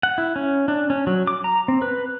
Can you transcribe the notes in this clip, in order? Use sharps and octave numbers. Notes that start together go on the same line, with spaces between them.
F#5
E4
C#4
D4
C#4
F#3
D6
A#5
C4
B4